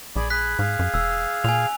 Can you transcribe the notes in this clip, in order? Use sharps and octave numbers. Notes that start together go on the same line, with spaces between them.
A#1 G#4 D5 B5
G#4 B5 F#6 B6
G#2 G#4 F5
F#2
E1 E6
A#2 G#5 F7